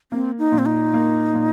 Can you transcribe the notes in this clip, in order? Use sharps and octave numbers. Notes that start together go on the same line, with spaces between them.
A#3 C4
D#4
A#2
C4
D#4
A#3
A#2